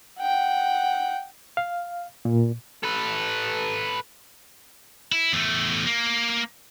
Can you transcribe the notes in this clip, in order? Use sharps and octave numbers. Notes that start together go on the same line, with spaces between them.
F#5 G5
F5
A#2
A4 B4
E4
E2 A3
A#3